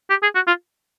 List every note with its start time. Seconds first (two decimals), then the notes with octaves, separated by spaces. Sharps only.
0.10 G4
0.22 G#4
0.35 F#4
0.47 F4